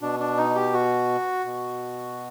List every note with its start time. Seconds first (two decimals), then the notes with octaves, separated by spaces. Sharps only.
0.01 B2 D4
0.20 D4
0.37 D#4
0.55 G4
0.73 F#4
1.45 B2